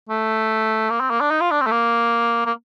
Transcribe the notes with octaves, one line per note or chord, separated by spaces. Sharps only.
A3
A#3
C4
A#3
D4
D#4
F4
D4
C4
A3
A#3
A#3